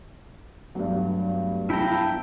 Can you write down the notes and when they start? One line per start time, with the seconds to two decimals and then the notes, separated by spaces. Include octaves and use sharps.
0.75 G2 F#3 A3 B3
1.70 E4 G5 A5 A#5